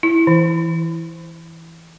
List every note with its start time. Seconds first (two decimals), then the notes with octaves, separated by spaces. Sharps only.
0.03 E4
0.27 E3